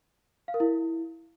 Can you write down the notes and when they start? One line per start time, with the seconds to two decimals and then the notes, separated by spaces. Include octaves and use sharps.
0.48 F5
0.54 A#4
0.60 E4